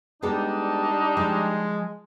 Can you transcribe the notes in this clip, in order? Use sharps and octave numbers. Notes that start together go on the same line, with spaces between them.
G3 G#3 B3 D4 D#4 A4
F3 G#3